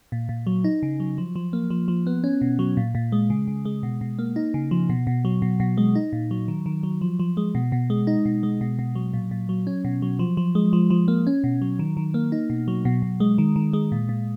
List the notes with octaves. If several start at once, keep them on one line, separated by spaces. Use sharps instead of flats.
A#2
A#2
F#3
D#4
C#3
F#3
F3
F3
A#3
F3
F3
B3
C#4
B2
F#3
A#2
A#2
G#3
C#3
C#3
G#3
B2
B2
A#3
D#4
C#3
F3
B2
B2
F#3
B2
B2
G#3
D#4
A#2
F#3
D#3
D#3
F#3
F3
F3
G#3
B2
B2
G#3
D#4
B2
G#3
B2
B2
F#3
A#2
A#2
F#3
C#4
B2
F#3
F3
F3
G#3
F3
F3
A#3
C#4
B2
F#3
D#3
D#3
A#3
D#4
B2
F#3
B2
B2
G#3
D#3
D#3
G#3
A#2
A#2